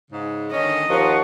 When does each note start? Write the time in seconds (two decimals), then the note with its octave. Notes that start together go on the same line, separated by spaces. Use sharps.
0.11 G#2 C#3
0.52 D3 D#3 C#4 D#5
0.89 D#2 F3 F#5 A#5 C#6